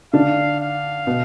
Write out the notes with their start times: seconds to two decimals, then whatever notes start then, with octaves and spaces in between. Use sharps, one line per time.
0.13 D3 D4 F5
0.60 F5
1.07 B2 B3